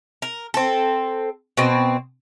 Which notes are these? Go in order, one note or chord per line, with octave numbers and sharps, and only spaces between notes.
A#4
C4 A4
B2 C4